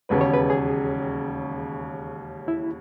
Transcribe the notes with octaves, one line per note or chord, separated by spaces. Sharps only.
E1 D#2 C#3 B4
C#5
B4
G#4
E4